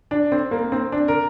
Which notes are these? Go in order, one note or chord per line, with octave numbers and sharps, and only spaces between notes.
D4
C4
A#3
C4
D4
A#4